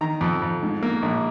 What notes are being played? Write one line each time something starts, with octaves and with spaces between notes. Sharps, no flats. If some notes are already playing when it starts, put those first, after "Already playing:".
D#3 A#5
F2
F2
G#2
A#3
A#1